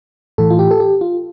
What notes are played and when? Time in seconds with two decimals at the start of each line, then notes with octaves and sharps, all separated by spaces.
0.38 A2 E3 A4
0.50 F4
0.59 G4
0.71 A4
0.80 G4
1.01 F4